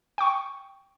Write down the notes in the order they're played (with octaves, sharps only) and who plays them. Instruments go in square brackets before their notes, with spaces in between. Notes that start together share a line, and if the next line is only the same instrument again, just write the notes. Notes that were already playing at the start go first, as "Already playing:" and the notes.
[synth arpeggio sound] G5 C#6